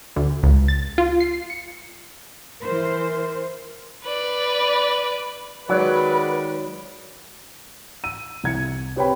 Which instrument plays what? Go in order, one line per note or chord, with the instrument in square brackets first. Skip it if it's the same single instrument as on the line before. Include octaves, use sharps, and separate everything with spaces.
[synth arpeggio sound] D2
C#2
A6
F4
C7
C#7
[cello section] E3 C5 [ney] A#4
[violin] B4 D5
[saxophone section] D#3 G#3 D5 [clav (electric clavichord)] F#3 [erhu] B4
[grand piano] E6 D#7
C2 G#6 C#7
C4 G4 B4 C#5 G5 B5